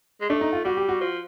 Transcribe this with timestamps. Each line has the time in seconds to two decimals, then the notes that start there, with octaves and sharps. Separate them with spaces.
0.21 G#3
0.30 A3 D4
0.41 D#4
0.53 F4
0.65 G3 F#4
0.77 G4
0.89 F#4
1.01 F3